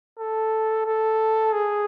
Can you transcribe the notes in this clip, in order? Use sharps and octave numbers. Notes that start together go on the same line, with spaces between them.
A4
A4
G#4